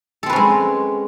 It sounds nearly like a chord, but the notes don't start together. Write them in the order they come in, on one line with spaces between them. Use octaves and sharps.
A4 C4 B4 C#4 G#3